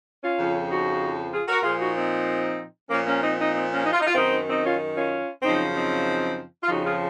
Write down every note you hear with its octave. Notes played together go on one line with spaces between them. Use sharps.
C#4 F4
F2 C#3 F3
D#4 F#4
F4 G#4
F#4 A#4
A#2 F3 F4 G#4
D#4 F#4
C4 D#4
A#2 F3 A#3 C#4
A#3 C#4
C4 D#4
C4 D#4
C4 D#4
A#3 C#4
D#4
F4
D#4
F4
F#2 D#3 C4 D#4
C4 D#4
C#4 F4
C#4 F4
F#2 C#3 F3 C4 D#4
C4 D#4
F4
F2 C#3 F3 D#4 F#4
F4 G#4